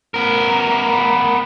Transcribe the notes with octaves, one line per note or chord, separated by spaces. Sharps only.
B3 A#4